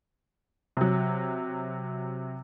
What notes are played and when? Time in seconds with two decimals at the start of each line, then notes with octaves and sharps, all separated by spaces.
0.77 C3 F#3